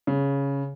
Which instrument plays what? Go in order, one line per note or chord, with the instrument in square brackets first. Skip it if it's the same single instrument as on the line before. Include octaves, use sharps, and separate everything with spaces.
[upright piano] C#3